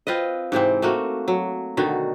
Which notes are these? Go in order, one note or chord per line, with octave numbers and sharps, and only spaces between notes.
C4 F4 B4 D#5
G#2 C3 E3 C4
A3 A#3 F#4
F#3
B2 D3 D#3 F#4